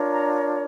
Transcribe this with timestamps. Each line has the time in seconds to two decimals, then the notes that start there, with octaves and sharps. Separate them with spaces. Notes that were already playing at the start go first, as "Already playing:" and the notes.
Already playing: D4 F4 A#4 C#5
0.11 A#5